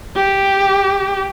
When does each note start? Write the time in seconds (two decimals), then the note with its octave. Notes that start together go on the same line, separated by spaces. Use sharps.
0.16 G4